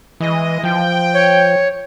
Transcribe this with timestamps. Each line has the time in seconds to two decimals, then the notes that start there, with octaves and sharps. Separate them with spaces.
0.20 E3 G#3 D#5
0.63 F3 G5
1.14 C#5